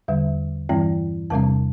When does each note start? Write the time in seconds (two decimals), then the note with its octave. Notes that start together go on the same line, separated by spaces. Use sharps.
0.08 E2 D3 G3 E5
0.69 G2 E3 G3 C4 G5
1.30 E2 C3 G3 C4 A5